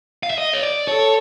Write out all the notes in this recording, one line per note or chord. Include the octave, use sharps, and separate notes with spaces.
F5
E5
D#5
C#5
D5
A4 C#5